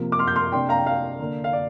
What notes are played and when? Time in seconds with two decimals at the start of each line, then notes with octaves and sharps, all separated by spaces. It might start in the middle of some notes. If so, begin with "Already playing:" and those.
Already playing: C3 F3 A#3
0.12 D6
0.19 C6 F6
0.28 G6
0.36 C6 F6
0.52 C3 A#3 D4 G5 C6
0.69 F5 A#5
0.78 G5
0.86 F5
1.19 D3 A#3 D4
1.44 F5
1.53 D5